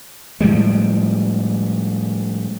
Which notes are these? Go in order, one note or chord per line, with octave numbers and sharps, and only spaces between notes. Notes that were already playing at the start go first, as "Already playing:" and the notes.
A2 F3 G3 G#3